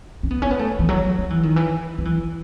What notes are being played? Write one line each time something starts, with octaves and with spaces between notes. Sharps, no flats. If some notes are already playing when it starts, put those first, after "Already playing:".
C#4
B3
C#4
B3
A3
E3
F#3
F#3
E3
D#3
E3
F#3
E3